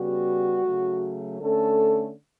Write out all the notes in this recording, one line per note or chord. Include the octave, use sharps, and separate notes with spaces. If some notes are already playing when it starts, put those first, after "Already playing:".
Already playing: C#3 G3 B3 F#4
C#3 F#3 A3
D3 A3 C#4 A4